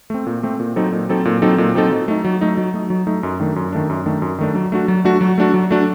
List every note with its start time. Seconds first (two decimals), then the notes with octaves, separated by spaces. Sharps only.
0.10 A3 C4
0.26 A#2
0.43 A3 C4
0.60 A#2
0.76 F#3 C4 D#4 A4
0.92 A#2
1.09 F#3 C4 D#4 A4
1.25 A#2
1.42 F#3 C4 D#4 A4
1.58 A#2
1.75 F#3 C4 D#4 A4
1.91 F#3
2.08 A3 D#4
2.25 F#3
2.41 A3 D#4
2.57 F#3
2.74 A3 D#4
2.90 F#3
3.07 A3 D#4
3.23 F#2
3.40 D#3 A3 D4
3.56 F#2
3.72 D#3 A3 D4
3.90 F#2
4.06 D#3 A3 D4
4.22 F#2
4.39 D#3 A3 D4
4.55 F#3
4.72 A3 D4 F#4
4.88 F#3
5.05 A3 D4 F#4
5.21 F#3
5.38 A3 D4 F#4
5.54 F#3
5.71 A3 D4 F#4